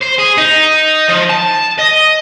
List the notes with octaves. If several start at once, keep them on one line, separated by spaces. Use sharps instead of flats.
C5
G#4
D#4
F3
A5
D#5